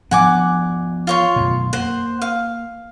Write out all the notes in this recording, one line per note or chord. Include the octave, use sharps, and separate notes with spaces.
F3 B3 D4 F#5 G#5 D6
F4 C#5 C6
F#2 B2
A#3 C5 F#5
F5